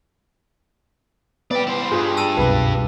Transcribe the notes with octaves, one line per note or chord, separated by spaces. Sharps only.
B3 D5 G5
E4 C5
G2 F4 G#4
A5 E6 D#7
C2 F#2 B2 B4